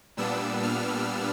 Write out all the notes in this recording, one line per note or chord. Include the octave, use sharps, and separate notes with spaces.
A#2 G3 B3 D4 E6
F6